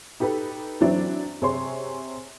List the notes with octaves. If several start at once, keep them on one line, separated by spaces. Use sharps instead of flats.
D#4 G4 A4 B4
E3 F#3 C4 D4 E4
C3 G#4 C#5 C6